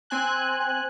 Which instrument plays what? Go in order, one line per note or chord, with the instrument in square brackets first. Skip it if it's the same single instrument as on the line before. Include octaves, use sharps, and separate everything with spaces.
[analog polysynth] C4 G#5 F#6